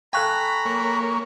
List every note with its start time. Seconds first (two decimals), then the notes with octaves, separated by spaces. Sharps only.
0.13 A4 F5 G5 G#5 A#5 B5 C#6 F#6
0.66 A#3 C#5